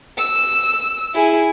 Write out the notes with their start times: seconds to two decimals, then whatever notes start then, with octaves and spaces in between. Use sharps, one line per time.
0.18 E6
1.15 E4 G#4